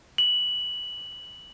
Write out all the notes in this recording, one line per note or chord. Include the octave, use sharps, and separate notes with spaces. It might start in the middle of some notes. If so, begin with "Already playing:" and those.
F#7